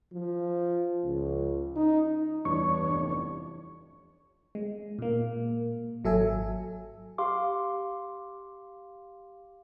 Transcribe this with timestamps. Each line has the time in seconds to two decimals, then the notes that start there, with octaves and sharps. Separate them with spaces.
0.13 F3
1.04 C#2
1.76 D#4
2.45 E2 G2 D4 C#5 C#6
2.89 F1
4.55 G#3
4.99 A#2 A#3
6.04 G#1 F#3 A4 E5 G#5
7.18 G4 F5 C6 D6